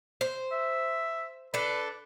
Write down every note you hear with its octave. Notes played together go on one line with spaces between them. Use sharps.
C5
E5
D4 A4 B4